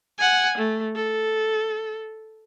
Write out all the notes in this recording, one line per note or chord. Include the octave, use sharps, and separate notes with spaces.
F#5 G#5
A3
A4